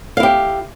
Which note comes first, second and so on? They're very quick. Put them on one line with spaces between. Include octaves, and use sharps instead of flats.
F5 E4 G4